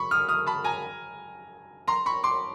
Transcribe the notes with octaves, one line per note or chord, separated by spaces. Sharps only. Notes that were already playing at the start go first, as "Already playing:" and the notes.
Already playing: B5 C#6
D#6 F6
D#6 F6
A5 B5
G#5 A#5
A#5 C6
B5 C#6
C6 D6